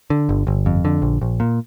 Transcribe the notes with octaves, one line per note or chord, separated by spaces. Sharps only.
D3
G1
G1
F2
D3
A#1
A#1
A#2